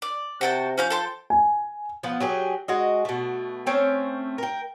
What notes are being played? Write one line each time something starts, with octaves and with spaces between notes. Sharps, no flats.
D5
C3 F#4 G5 A5
F3 C#4 F5 G6
A4 G5 C6
G#5
F3 B3 F#5
F#3 G4 G#4
G#3 F#4 D#5
B2 A3
A3 C4 C#4
A#4 G5